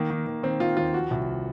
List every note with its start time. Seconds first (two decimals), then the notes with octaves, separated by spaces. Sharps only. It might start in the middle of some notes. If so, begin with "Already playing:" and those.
Already playing: D#3 A#3
0.10 D#3
0.27 D#3
0.43 D#3 C4
0.60 D#3 F4
0.77 D#2 F4
0.94 F3 F#4
1.11 C2